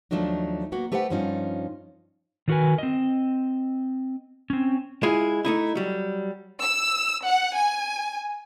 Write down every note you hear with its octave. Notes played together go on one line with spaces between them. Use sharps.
D#2 F3 F#3 A3 D4 D#4
A#3 B3 F#4
A3 G4 B4 C5 D#5 F#5
G2 F3 C#4 D#4 F4
D#3 F#3 F#4 A#4 B4 G#5
C4 D#5
C4 C#4
G#3 E4 F4 G#4
A3 D#4 E4
F#3 G3
E6
F#5
G#5